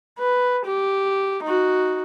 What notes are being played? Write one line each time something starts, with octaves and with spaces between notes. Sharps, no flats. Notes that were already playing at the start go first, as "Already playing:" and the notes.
B4
G4
D#4 F#4